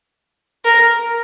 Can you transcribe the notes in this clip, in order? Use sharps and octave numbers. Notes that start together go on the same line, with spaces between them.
A#4